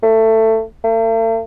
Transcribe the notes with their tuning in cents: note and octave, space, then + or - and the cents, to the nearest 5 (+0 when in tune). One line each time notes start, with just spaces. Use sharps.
A3 +20
A3 +45